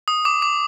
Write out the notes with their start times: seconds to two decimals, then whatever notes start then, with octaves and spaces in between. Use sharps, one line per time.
0.08 D#6
0.25 D6
0.42 D6